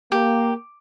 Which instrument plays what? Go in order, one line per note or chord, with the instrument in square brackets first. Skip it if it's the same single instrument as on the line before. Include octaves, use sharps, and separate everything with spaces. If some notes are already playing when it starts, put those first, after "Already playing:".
[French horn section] A#3 [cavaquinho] G4